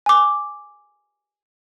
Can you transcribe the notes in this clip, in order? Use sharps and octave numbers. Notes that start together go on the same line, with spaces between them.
G#5 D6